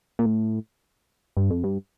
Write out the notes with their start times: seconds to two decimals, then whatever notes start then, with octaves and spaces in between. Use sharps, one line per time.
0.19 A#2
0.26 A2
1.37 G2
1.50 F2
1.64 G2